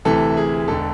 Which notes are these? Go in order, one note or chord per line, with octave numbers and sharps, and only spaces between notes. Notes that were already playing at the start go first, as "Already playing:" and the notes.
D2 C3 E3 A4
G#4
E1 D3 A4